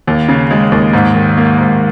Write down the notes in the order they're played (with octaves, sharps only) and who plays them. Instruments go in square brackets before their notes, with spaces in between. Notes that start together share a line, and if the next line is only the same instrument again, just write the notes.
[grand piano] D#2
C#3
G#3
D#2
G#2
D#3
A#3
G#2